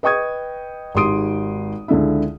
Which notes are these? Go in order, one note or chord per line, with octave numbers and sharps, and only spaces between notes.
B4 D#5 G5 C#6 D#6 G#6
G#1 G#2 G4 C6 D#6 D7
C#2 D3 E4